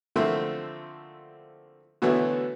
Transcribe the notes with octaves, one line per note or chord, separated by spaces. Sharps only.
D3 F3 A3 A#3 C4 E4
B2 D3 E3 F#3 A3 B3